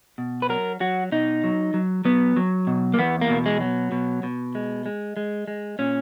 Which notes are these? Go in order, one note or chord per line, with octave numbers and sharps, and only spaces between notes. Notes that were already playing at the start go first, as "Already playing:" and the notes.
B2
B4
F#3 A#4
F#3 F#4
B2 D#4
F#3
F#3
F#3 B3
F#3
B2
A#3
E2 B3
A#3
B2
G#3
F#3
B2
B2
G#3
G#3
G#3
G#3
A#2 C#4